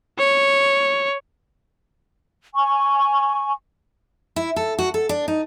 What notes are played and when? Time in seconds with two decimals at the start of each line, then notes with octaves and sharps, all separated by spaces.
0.19 C#5
2.55 G#5 C#6
4.36 E4
4.56 A4
4.79 F#4
4.94 A4
5.09 D4
5.28 D#4